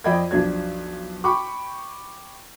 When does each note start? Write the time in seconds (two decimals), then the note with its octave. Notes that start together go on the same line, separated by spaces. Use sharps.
0.04 F2 D5 D#5 G5 B5 G#6
0.31 B1 F2 D4 G#6
1.24 G5 B5 C#6 D6